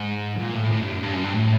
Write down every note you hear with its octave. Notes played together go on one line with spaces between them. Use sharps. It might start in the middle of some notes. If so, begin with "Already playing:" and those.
Already playing: G#2
A#2
A2
A2
G2
F#2
G2
F#2
G2
A2